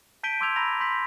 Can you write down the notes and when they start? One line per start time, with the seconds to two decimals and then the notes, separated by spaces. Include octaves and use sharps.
0.23 A5 G6 B6 D7 D#7 G7
0.41 C6 D6 E6 G6 G#6 F7
0.56 A#5 B5 E6 A#6 F7
0.81 C6 G6 B6